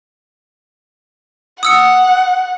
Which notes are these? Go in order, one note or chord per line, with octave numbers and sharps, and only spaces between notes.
F#5 D#6 E6 C#7